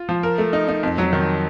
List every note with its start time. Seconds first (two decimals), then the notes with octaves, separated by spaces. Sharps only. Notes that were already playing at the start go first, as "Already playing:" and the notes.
Already playing: F4
0.09 F3
0.23 A#4
0.38 A3
0.53 D#4
0.68 D#4
0.83 F2
0.98 F#3
1.13 D#3